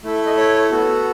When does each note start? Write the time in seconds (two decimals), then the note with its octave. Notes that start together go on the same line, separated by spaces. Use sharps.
0.03 A3 E4 A4
0.15 E5
0.26 D#5
0.37 C#5
0.71 B3 F#4 A4